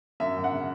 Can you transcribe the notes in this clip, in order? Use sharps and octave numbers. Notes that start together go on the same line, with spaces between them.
F#2 E5
F#2
F#5
C#3